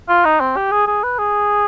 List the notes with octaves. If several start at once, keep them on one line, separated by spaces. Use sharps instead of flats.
F4
D#4
C4
G4
G#4
G#4
B4
G#4